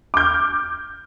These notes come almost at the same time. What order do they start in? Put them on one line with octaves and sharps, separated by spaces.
D6 G6 F6